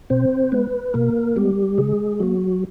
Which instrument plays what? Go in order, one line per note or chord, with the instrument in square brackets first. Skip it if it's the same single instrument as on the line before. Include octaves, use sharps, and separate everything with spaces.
[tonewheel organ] B2 C4 C5
G#3 B3 B4
B2 A#3 A#4
G3 G#3 B3 G4
C#3 G#3 G#4
F#3 A#3 F#4